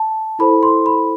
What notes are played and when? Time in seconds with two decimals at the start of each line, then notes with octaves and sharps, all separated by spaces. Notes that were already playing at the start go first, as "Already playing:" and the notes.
Already playing: A5
0.39 E4 A4 C5 B5
0.63 C6
0.86 B5